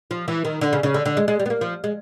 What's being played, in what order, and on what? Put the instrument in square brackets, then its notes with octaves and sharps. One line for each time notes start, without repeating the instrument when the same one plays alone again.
[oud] F3
E3
D#3
D3
C#3
C#3
D3
D3
G#3
G#3
G3
B3
A#3
F3
G#3